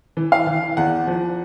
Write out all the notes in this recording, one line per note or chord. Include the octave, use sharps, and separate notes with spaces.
E3
F5
E3
E2 F#5
F3